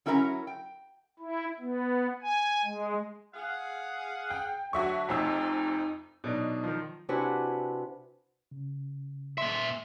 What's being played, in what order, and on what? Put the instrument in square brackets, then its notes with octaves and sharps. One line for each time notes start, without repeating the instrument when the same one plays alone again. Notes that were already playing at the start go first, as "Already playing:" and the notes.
[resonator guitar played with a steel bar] F#3 C#4 E4 A#4 F#5 A#5
G5
[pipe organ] E4
B3
G#5
G#3
[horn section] G#4 F5 F#5
[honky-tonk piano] G5
[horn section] D3 F#3 A3 [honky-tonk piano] F#4 E5 C#6
[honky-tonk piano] F1 F2 E6 [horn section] D#4
[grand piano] B2 F#3 D4 D#4
D#3 F3
[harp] C3 D4 E4 F#4 B4 G#5
[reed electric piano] C#3
[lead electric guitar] A#2 E5 [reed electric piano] C6